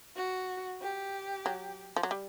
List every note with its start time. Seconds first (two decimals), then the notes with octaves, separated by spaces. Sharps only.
0.16 F#4
0.81 G4
1.46 F#3
1.96 F3
2.03 F#3
2.11 G3